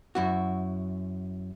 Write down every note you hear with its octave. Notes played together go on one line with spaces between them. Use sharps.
F#2 E4 F#4